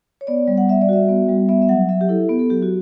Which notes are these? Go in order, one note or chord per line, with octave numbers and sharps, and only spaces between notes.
C#5
B3 D5
G3
F#5
G3 E5
D5
F#4 E5
B3
G3
B3 E5
E5
F#3 F#5
F#3 E5
G4
E4 A4
B3
A4
F#3 G4
F#4